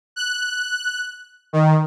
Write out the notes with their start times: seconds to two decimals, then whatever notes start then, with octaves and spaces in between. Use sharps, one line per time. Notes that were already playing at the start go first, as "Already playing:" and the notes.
0.16 F#6
1.53 D#3